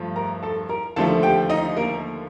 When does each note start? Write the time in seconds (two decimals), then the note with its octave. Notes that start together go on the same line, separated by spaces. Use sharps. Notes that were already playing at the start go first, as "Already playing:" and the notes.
Already playing: G2 F3 A3
0.16 A#4 A#5
0.43 A4 A5
0.69 A#4 A#5
0.96 D#2 D3 F3 A3 A4 A5
1.23 G4 G5
1.50 D#4 D#5
1.77 A#3 A#4